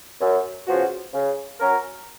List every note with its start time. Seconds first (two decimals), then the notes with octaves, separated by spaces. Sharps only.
0.21 F#2
0.67 C#3 F3 B3 F#4
1.14 C#3
1.60 F#3 C#4 F#4 A#4